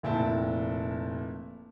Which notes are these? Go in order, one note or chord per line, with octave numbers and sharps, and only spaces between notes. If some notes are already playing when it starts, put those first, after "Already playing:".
F1 A#2 E4 G5 A5